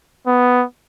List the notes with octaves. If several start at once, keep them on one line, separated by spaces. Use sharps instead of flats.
B3